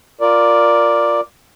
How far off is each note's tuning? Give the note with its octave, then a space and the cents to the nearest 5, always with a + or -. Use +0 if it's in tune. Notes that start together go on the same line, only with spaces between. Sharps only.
F4 +0 A#4 +0 D5 +0